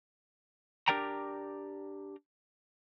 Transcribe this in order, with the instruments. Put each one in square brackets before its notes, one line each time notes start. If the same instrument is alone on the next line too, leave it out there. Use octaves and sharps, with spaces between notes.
[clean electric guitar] D4 G4 A#4 D5 G5 A#5